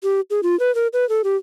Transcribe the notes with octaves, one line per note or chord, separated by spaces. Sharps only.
G4
G#4
F4
B4
A#4
B4
A4
G4